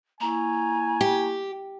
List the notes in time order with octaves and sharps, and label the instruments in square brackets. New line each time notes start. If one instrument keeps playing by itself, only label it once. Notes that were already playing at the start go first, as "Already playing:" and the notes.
[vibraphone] A#3 E4 C#6 [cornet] G#5 [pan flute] A#5
[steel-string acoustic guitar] G4